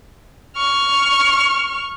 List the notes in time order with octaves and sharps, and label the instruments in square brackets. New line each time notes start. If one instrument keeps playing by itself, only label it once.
[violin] C#6 F6